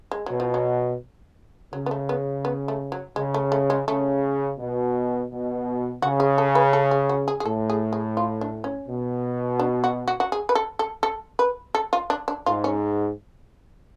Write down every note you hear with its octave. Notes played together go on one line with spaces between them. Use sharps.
G#3
B2 F#3
F3
F#3
C#3 F#3
B3
A3
B3
B3
A3
F#3
C#3 G#3
A3
A3
G#3
C#3 A3
B2
B2
C#3 F#4
G#4
A4
B4
A4
G#4
F#4
G#4
G#4
A2 A4
G#4
G#4
F4
D4
C#4
B2
D4
F#4
F#4
F#4
G#4
B4
A4
A4
A4
B4
A4
F4
D4
D4
G#2 F4
C#4